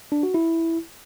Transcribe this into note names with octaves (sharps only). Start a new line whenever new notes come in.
D4
F#4
E4